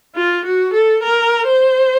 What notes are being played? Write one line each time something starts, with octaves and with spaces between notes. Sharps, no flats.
F4
F#4
A4
A#4
C5